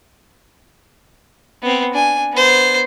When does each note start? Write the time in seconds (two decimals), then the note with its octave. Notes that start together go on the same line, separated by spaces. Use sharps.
1.62 B3 C4
1.94 D4 G#5
2.33 B3 C5